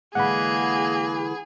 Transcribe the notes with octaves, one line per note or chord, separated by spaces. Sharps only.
D3 E3 G#3 A#3 G#4 F#5 B5